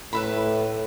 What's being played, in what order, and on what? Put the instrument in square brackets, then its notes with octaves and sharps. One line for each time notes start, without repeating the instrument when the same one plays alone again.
[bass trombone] A2 [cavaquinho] B4 E5 B5